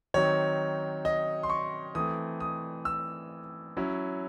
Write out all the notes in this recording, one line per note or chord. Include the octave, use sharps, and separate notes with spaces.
D#3 F#3 C4 D#4 C#5
D#5
C6
C#6
E3 A3 C4 D#6
D#6
E6
F#3 C#4 E4